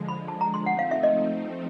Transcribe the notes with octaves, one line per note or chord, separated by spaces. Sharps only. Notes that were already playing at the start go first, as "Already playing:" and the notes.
Already playing: D3 F3 G#3
B5
A5
A#5
C6
F3 A3 C4 D#4 F#5
F5
E5
D#5